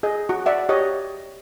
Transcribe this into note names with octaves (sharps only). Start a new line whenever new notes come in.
G#4 D#5
F#4
D5 E5 F#5
G4 C#5 D#5